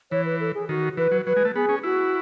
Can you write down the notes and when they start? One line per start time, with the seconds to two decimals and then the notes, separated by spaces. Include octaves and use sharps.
0.11 E3 C#5
0.25 B4
0.40 A4
0.54 G#4
0.69 D#3 F#4
0.97 E3 B4
1.11 F#3
1.26 F#3 B4
1.36 G#3
1.45 A3
1.55 B3 G#4
1.69 C#4
1.83 E4 F#4